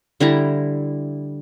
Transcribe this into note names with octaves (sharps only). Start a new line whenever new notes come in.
D3 G3 E4 A#5